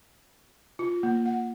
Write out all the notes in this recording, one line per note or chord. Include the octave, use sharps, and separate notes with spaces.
F4
A#3
F#5